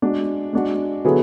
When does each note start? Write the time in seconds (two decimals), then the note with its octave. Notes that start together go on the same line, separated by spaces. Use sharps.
0.02 G#3 D4 F#4
0.53 G#3 D4 F#4
1.04 D3 F#3 B3 E4 G#4